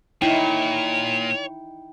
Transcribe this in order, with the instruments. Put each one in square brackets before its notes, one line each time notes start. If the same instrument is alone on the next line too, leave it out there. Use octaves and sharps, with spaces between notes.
[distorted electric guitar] A#2 [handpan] D#4 E4 [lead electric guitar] C#5 [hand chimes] G5